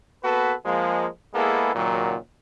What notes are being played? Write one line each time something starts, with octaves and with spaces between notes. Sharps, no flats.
A#3 B3 F#4 A4 B4
F3 G#3 A#3
G#3 A#3 B3 E4 G#4 A4
C#2 A#2 D#3 F#3